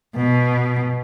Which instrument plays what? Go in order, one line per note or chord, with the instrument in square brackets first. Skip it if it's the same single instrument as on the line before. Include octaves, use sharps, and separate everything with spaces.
[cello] B2